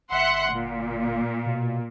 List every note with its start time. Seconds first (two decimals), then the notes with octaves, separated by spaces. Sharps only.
0.11 G1 E5 F#5 C6
0.52 A#2
1.46 B2